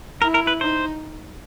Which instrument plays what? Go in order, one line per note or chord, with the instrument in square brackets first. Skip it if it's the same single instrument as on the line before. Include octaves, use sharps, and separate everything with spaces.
[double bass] E4 [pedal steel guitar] A#4
[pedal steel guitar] A#4
B4
[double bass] D#4 [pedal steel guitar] C5